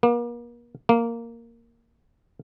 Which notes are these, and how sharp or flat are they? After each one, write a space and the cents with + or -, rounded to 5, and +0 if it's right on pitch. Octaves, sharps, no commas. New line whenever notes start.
A#3 +40
A#3 -5